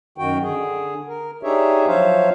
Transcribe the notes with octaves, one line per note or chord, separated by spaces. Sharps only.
F#2 D#3 F#4 G5
D3 G#4
A#4
D4 D#4 G4 G#4 C#5 E5
F3 F#3 C5 C#5 E5 F5